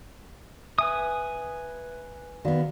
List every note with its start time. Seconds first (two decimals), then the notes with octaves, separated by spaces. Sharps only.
0.79 B4 E5 G#5 D#6
2.45 D#3 B3 F#4 D5 F5